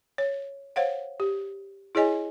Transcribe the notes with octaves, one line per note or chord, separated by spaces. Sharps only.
C#5
C5 C#5 F5 F#5
G4
E4 G#4 C#5 D#5 G#5